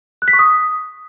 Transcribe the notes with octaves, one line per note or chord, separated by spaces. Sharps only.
F#6
B6
C#6
D#6